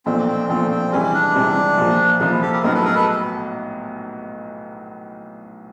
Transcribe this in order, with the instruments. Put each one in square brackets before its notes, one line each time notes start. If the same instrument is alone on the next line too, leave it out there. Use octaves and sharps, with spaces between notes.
[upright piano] B1 A#2 F3 A3 D4 [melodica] C4
[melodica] C4
[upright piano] B1 A#2 F3 A3 D4 [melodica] C4
[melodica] C4
[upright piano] C#2 C3 E3 G3 C4 [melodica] C#4
[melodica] D4
[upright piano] C#2 C3 E3 G3 C4
C2 A#2 F3
[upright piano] C2 A#2 F3 [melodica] D#4
[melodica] E4
G4 A4
G#4 A#4
[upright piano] B1 A2 F#3 B3 D#4 [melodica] G#4 A#4
[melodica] A4 B4
G#4 A#4
A4 B4